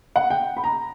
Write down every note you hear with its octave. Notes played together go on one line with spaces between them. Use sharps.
F#5
G5
B5
A#5